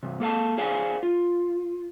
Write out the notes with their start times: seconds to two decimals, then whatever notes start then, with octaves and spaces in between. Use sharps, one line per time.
0.03 G2 C3
0.20 A#3 A4 F5 A5
0.58 G#4 C5 D5 F5 F#5 G#5
1.03 F4